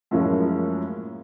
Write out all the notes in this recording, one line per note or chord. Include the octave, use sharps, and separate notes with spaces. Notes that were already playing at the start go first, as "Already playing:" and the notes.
F#2 A2 F3 G#3 A#3 C#4